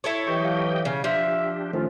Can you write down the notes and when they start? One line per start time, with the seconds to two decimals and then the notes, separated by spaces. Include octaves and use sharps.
0.04 E4 A4 C#5
0.27 E3 F#3 G4 D#5 G5 C#6
0.45 F5
0.85 C#3
1.04 F3 D4 G4 E5
1.73 A2 D#3 A3 C#4 F4 C5